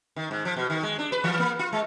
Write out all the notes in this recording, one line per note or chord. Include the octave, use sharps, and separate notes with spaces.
D#3
G#2
F3
B2
D#3
G#3
D4
B4
E3
A#3
F4
G#3